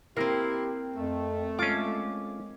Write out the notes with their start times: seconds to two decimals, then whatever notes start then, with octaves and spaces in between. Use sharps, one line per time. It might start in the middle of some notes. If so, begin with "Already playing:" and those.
0.16 A#3 C4 E4 G4 A#4
0.96 F2 A3
1.59 G#3 C#4 F4 D6